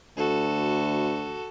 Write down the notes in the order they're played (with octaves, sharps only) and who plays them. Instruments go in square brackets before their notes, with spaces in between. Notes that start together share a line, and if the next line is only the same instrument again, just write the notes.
[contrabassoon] D2 [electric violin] F#4 A4